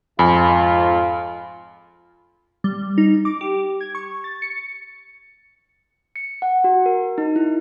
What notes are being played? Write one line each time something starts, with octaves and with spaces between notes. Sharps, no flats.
F2 G#2 F4 G#5 B5
G3
D#4
D6
G4
G#6
C#6
A6
C#7
C#7
F#5
F#4
A#4
D#4
E4